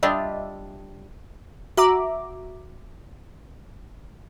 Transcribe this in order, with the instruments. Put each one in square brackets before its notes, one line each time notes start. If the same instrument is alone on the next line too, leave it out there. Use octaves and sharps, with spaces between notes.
[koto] G3 D4 F4 [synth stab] D#5 E5
[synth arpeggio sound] F#4 E5 A#5 D6